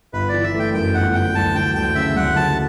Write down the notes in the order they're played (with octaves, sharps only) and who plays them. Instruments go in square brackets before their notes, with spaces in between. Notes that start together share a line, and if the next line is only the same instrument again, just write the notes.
[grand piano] G1 [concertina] B4
[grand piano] E3 [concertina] D5
[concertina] E5
[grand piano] A3
[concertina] G5
[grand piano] F#2 [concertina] G5
[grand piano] G1 [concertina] F#5
[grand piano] E3 [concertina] G5
[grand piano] D2 [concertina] A5
[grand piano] F#3 [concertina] G5
[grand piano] D2 [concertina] G5
[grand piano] C#3 [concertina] E5
[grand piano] D2 [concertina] F#5
[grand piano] F#3 [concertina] A5